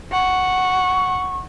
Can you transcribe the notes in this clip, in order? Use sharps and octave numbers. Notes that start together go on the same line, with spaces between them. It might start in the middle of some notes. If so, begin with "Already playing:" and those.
F#5 C#6